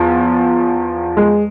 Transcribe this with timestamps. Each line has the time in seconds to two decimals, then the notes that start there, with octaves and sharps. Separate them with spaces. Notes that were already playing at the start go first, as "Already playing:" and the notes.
Already playing: E2 F3
1.17 G#3